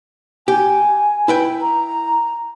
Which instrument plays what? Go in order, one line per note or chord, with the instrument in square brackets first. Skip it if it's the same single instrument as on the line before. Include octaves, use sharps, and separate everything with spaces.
[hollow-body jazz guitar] G4 [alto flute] G#5
[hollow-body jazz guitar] E4 B4 G5
[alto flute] A#5